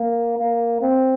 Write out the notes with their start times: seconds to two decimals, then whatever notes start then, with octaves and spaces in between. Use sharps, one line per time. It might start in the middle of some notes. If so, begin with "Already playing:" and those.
Already playing: A#3
0.37 A#3
0.82 C4